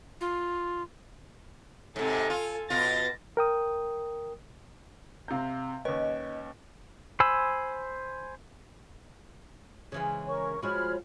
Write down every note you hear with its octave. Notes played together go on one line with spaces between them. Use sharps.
F4
G#2 C3 A4 G#5
F4
B2 F4 A6 A#6
A#4 G5 D#6
C3 F5 A#5 G6
D#2 C#4 B4 D#5
C5 G#5 B5 E6
C#3 E3 G#3
A#4 C#5 C#6
F3 G#3 F#4 C#5 B5 F6